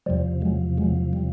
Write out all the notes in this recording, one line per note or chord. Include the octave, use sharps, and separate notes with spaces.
E2 C3 F3 G3
F#3 G#3
F#3 G#3
G3